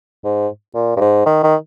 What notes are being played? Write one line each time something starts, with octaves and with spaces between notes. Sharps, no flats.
G#2
A#2
G2
G#2
D#3
D#3